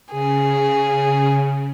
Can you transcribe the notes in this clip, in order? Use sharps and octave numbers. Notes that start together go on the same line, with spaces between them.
C#3 G#4